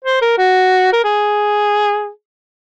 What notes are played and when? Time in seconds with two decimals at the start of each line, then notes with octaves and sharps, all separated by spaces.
0.04 C5
0.22 A#4
0.38 F#4
0.93 A#4
1.04 G#4